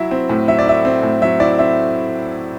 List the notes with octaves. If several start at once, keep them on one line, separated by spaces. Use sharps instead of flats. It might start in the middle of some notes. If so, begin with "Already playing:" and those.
Already playing: F#3 E4 E5
C4
A2
F#3 E5
D5
E4 E5
C4
A2
F#3 E5
E4 D5
C4 E5